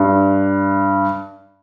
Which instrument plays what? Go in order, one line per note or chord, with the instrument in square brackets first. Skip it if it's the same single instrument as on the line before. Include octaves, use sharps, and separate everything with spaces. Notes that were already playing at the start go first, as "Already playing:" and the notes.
Already playing: [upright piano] G2